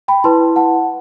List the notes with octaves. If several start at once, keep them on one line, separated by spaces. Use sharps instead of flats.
G5 B5
E4 B4 A5 C6
F#5 A5